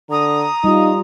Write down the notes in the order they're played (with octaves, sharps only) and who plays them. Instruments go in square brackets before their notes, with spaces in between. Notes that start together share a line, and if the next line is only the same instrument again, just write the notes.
[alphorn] D3 [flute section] A#5 D#6
[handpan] G3 F4 [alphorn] D#4